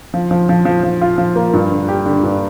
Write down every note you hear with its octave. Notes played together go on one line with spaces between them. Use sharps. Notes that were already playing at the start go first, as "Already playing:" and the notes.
F3
F3
F3
F3
F3
F4
F3
A#3
G2
D3
G4
D3
G2